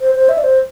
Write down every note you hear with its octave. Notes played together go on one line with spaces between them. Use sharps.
C5
C5
E5
D5
C5